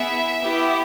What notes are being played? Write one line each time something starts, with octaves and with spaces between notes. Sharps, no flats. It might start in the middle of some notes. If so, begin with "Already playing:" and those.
Already playing: B3 E4 G#4 E5
B3 E4 G4